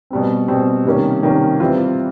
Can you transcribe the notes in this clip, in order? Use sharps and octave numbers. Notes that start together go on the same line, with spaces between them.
B2 G3 C4
B2 G3 C4
C3 D#3 G3 A#3 C#4
C3 D#3 G3 A#3 C#4
E3 G3 C4 F4